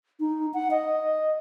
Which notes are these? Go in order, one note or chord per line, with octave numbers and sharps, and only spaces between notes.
D#4
F#5
D#5